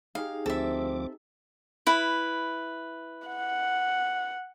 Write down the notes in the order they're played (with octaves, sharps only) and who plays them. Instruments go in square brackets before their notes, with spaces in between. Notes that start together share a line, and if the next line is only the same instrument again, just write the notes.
[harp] D#4 G4 G#4 [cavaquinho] F5
[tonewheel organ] D2 F3 D6 [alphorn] C4 [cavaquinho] A4 E5
[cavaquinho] E4 B4
[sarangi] F#5